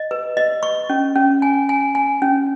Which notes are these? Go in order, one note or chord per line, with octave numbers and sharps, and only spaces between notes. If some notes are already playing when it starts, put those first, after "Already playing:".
Already playing: D#5
B4
D#5
C#6
C#4
C#4
G#5
G#5
G#5
C#4